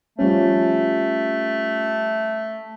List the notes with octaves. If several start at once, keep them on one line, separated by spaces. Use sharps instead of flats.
F3 G3 A3 C#4